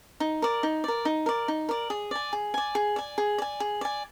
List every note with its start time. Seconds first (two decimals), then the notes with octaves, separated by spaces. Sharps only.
0.20 D#4
0.42 A#4 D5
0.63 D#4
0.84 A#4 D5
1.05 D#4
1.26 A#4 D5
1.48 D#4
1.69 A#4 D5
1.90 G#4
2.11 D5 G#5
2.33 G#4
2.54 D5 G#5
2.75 G#4
2.96 D5 G#5
3.18 G#4
3.38 D5 G#5
3.60 G#4
3.81 D5 G#5